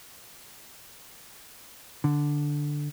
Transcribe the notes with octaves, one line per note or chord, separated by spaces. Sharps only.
D3